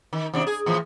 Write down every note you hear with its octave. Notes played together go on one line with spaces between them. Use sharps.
D#3
D#2 C3 D4
G#4
A2 E3 F3